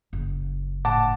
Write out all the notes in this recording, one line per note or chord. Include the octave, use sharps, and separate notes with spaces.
F#1
A2 F#5 A5 D6